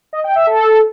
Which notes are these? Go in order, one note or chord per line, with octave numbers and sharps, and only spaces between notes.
D#5
G5
E5
A4